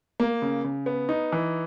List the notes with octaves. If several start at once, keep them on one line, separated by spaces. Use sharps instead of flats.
A#3
C#3
C#3
B3
D#4
E3